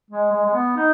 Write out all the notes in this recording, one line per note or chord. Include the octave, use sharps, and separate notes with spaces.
G#3
G#3
G#3
B3
D#4